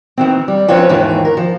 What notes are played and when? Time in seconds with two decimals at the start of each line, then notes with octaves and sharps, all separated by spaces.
0.17 D#3 E3 C4
0.48 G3
0.68 F3 C4 C#4 F4 B4 C#5
0.89 D#2 G#2 D#3 E3
1.25 A#4
1.37 F3